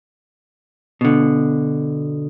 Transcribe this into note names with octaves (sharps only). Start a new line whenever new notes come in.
B2 D3